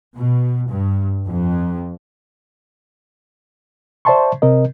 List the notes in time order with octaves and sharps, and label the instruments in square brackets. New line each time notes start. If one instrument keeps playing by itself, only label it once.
[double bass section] B2
G2
F2
[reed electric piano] C5 D5 E5 A5 C6 C#6
C3 C4 A#4 D#5